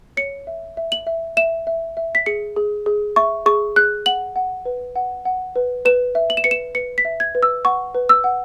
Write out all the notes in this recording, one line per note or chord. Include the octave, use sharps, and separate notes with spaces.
C#5 C#7
E5
E5
F#7
E5
E5 E7
E5
E5
B6
G#4 C#7
G#4
G#4
E5 C#6
G#4 C#6
G#4 F#6
F#5 F#7
F#5
B4
F#5
F#5
B4
B4 E7
E5
F#7
E7
B4 C#7
E7
B4 C#7
B6
E5
G#6
B4
E6
F#5 C#6
B4
E6
F#5